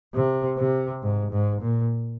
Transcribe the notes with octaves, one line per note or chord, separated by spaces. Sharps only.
C3
C3
G#2
G#2
A#2